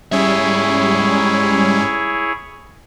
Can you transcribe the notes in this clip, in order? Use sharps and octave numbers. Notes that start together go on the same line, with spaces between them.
G#2 G3 C#4 E4 G#4 C#5 E5